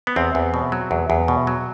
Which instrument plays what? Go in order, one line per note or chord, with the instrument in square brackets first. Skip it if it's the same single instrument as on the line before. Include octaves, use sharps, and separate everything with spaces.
[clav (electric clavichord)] B3
E2 C4
E2
B2
F#3
E2
E2
B2
F#3